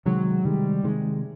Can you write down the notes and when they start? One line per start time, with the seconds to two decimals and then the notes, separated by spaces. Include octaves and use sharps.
0.05 C3 D#3 F#3 G#3
0.44 C3 D#3 G3 G#3
0.84 C3 D#3 G#3